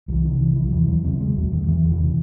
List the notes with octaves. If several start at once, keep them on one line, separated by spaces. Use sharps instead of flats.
C2 E3 F#3
C3 D#3
C3 E3
C2 E3
F#3
D#2 E3
E1 F#3
C#3 C4
E1 G#3
D#2 F#3
E1 D#3
E2 E3
E1
E3
C3